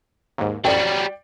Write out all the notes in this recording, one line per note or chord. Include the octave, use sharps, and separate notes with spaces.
D#2 G#2
A1 F2 F#3 G3 D5 G5